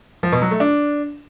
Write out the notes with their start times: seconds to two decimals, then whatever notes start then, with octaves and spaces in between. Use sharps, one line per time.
0.23 F3
0.32 B2
0.42 F#3
0.51 A3
0.60 D4